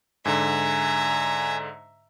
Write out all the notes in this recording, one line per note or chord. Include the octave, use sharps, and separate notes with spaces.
G#2 D3 E5 G#5 A#5